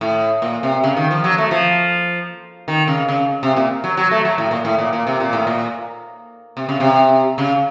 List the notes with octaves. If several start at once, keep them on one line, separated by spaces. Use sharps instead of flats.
A2
A#2
C3
C#3
D#3
F3
F#3
A3
F3
D#3
C#3
C#3
C3
A#2
F#3
F#3
A3
F#3
A2
A#2
A2
A#2
A#2
C3
A#2
A2
A#2
C3
C#3
C3
C#3